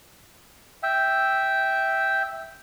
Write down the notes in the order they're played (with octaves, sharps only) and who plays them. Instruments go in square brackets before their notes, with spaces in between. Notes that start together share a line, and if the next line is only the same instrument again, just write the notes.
[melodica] E5 G5